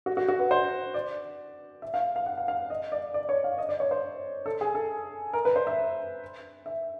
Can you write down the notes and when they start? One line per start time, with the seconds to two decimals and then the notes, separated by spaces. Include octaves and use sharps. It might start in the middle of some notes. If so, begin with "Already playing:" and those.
0.06 F#4
0.17 F#4
0.28 F#4
0.39 B4
0.51 C5
0.94 D5
1.82 E5
1.94 F5
2.16 F5
2.26 F#5
2.37 F5
2.48 F5
2.70 D#5
2.92 D5
3.14 D5
3.29 C#5
3.44 F5
3.58 D#5
3.69 D5
3.80 C#5
3.91 C5
4.46 A4
4.61 G#4
4.75 A4
5.33 A#4
5.45 B4
5.56 C5
5.67 E5
6.66 E5